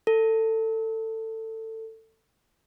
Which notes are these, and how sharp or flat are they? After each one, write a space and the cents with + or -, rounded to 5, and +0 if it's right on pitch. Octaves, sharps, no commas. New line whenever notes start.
A4 +20